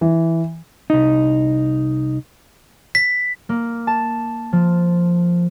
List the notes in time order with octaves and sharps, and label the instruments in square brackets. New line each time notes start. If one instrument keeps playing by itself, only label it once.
[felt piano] E3
[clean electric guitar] C2 D#4
[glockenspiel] B6
[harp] A#3
A5
F3